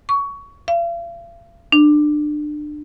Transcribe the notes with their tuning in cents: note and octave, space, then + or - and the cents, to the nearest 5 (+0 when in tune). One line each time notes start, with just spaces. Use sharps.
C#6 +20
F5 -40
D4 +25